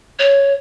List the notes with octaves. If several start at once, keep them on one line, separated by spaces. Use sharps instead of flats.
C#5